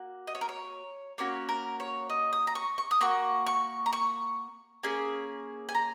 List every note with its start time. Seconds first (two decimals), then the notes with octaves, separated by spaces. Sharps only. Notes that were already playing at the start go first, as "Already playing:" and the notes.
Already playing: A#3 F#4
0.27 D#5
0.35 C#5
0.41 A#4
0.49 C#5
1.18 A#3 C#4 F#4 C#5
1.49 A#4
1.80 C#5
2.10 D#5
2.33 D#6
2.47 A#5
2.55 C#6
2.78 C#6
2.91 D#6
3.01 A#3 F#4 C#6
3.46 C#6
3.86 A#5
3.93 C#6
4.83 A#3 C#4 G#4
5.69 G#5
5.75 A#5